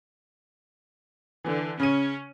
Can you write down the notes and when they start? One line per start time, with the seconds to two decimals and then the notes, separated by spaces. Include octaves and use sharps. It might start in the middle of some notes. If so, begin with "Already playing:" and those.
1.44 D3 E3
1.80 C#3 C#4 D#7